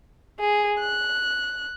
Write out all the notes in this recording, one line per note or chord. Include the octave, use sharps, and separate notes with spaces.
G#4
F#6